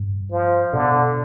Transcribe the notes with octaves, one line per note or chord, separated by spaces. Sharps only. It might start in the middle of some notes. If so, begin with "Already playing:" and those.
Already playing: G2
F3
B2 D3